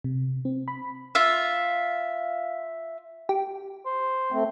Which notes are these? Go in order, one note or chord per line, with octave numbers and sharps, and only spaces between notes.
C3
C4
B5
F4 E5
G4
C5
A3 C4